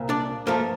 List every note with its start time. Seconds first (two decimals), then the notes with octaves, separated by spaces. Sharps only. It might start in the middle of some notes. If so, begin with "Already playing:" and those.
Already playing: C2 A#2
0.09 D4 D5
0.47 G2 F3 A3 A#3 A#4